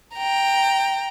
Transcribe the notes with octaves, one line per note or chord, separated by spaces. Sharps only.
G5 A#5